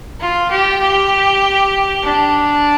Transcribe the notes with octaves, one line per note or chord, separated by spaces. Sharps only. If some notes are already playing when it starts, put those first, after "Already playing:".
F4
G4
G4
D4